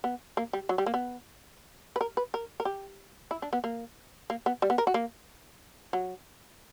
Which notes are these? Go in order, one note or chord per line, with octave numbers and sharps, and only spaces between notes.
B3
A#3
G3
F#3
G3
A#3
B3
B4
A#4
B4
A#4
A#4
G4
E4
D4
B3
A#3
A#3
B3
G3
B3
A#4
F#4
A#3
F#3